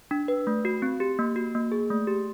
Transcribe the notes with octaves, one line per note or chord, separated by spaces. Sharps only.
D4
B4
A3
F#4
C4
G4
A#3
F#4
A#3
G#4
A3
G4